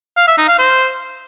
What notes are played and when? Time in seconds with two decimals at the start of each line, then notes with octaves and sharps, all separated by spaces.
0.17 F5
0.28 E5
0.38 D#4
0.48 F5
0.59 C5